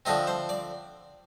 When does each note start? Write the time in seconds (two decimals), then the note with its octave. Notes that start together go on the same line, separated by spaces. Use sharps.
0.06 D3 F3 A3 C4 D#5
0.27 C5
0.49 D5